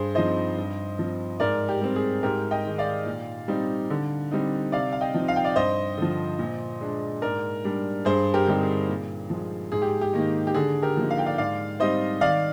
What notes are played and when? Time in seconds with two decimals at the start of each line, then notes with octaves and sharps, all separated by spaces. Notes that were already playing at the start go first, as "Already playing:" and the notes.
Already playing: G2 G#4 C5
0.15 F3 C4 D#4 C5 D#5
0.57 G2
0.99 F3 C4
1.40 G#2 A#4 D5
1.69 G4
1.81 G3 C4
1.96 G#4
2.23 G#2 G4 A#4
2.51 D#5 G5
2.65 D#3 G#3 D#4
2.78 D5 F5
3.06 A#2
3.48 G3 C4 D#4
3.90 D3
4.31 G3 C4 D#4
4.72 C3 D5 F5
4.92 F5
5.01 D#5 G5
5.14 F3 C4 D#4
5.28 F5
5.36 G5
5.44 D5 F5
5.56 G2 C5 D#5
5.97 D3 F3
6.39 A#2
6.81 G#3 D4
7.22 G#2 A#4 D5
7.65 G3 D4
8.05 G2 G#4 C5
8.34 G4 A#4
8.47 D3 G3 C4 D#4 G4
8.61 G#4
8.88 A#2
9.30 F3 G#3
9.72 G#2 G#4
9.82 G4
10.01 G4
10.13 D#3 A#3 D#4
10.47 G4
10.54 D3 G#4
10.82 G4 A#4
10.97 F3 A#3 D#4
11.10 F5
11.18 G5
11.26 D5 F5
11.38 G#2 D5 F5
11.80 G3 C4 D#4 C5 D#5
12.21 D#3 D5 F5